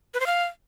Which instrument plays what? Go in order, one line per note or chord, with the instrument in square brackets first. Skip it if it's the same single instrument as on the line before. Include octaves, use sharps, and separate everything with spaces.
[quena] B4
C5
F5